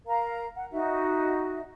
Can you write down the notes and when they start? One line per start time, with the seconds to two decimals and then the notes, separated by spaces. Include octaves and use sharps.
0.06 A#4 F5 A#5
0.55 F#5
0.71 D#4 F#4 E5